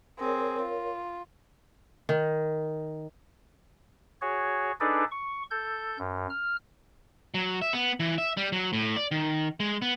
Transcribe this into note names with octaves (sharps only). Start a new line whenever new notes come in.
C4 G#4 A#4 C#5
F4
D#3
F#4 G#4 C#5
D4 D#4 G#4 A4 B4 D5
C#6
A4 G6
F#2
F6
F#3
E5
B3
E3
E5
G3
F#3
A2
D5
D#3
G#3
B3